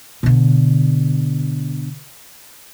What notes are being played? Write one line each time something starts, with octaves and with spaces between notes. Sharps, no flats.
B2 D3